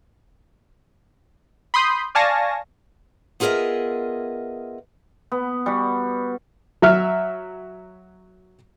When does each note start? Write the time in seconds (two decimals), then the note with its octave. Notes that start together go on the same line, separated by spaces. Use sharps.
1.74 B5 C6 D#6 G6
2.15 D5 F5 G#5 A5 C#6 A#6
3.40 B3 F4 G#4 A#4 D#5 E5
5.32 B3
5.66 G3 F#4
6.82 F#3 E5 F6